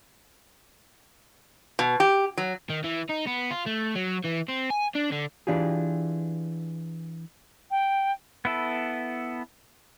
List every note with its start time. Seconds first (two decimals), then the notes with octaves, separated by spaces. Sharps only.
1.79 B2
2.00 G4
2.37 F#3
2.70 D#3
2.84 E3
3.10 D#4
3.27 B3
3.51 F4
3.66 A3
3.96 F#3
4.25 E3
4.49 C4
4.70 G#5
4.95 D4
5.12 D3
5.47 E3 D4 F4 G4 G#4
7.70 G5
8.45 B3 E4 A4